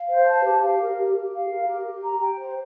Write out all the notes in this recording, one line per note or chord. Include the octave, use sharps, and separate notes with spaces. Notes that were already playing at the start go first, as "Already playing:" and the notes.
Already playing: F5
C5
A5
G4
F5
A#4
G4
G4
F5
A#4
G4
G4
A#5
G5
C5